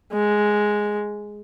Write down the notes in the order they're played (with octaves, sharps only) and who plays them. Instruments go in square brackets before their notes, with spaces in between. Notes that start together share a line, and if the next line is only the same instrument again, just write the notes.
[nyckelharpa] G#3